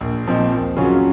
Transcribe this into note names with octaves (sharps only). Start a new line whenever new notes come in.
A#1
A#2 F3 C4 D#4
D#2
C#3 F#3 C#4 F4